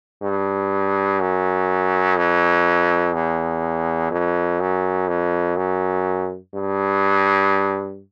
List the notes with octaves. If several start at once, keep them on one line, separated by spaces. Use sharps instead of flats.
G2
F#2
F2
E2
F2
F#2
F2
F#2
G2